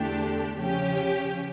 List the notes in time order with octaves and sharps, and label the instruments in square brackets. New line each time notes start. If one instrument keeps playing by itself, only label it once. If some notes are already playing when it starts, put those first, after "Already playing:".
Already playing: [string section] E2 D3 A3 D4 G4
C#3 F3 C#4 G4